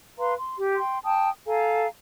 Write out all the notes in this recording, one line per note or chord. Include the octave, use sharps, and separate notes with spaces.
B4 F5 A#5 C6
C6
G4
G5 C6
G5 A5 D#6
A4 F5 G#5 A#5